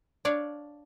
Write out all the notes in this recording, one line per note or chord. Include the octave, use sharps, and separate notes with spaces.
D4 C#5 D5 F5